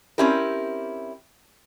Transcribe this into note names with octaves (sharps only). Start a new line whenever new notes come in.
C4 C#4 E4 G4 A#4